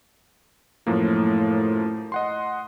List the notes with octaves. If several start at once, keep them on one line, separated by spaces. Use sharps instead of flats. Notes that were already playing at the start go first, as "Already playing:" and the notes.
F#2 A2 F3 A#3
D#5 F#5 C6